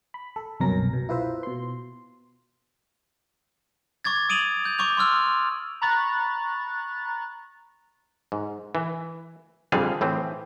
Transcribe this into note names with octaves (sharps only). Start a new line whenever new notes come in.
B5
A4
C2 F#2 B2 C#4 A#4 A#6
B2
E4 F4 B4 C5 E5
B2 C6
C#6 D6 G#6 A6
D#6 D7 D#7 F7 F#7
G6
C#6 D6 G6 F7
C6 C#6 E6 F6 G6
A#5 B5 C#6 F#6 A6
G#2
E3
F2 D3 G3 G#4 F5
A2 E3 C4